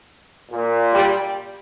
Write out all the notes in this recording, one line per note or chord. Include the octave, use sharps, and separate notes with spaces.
A#2
G3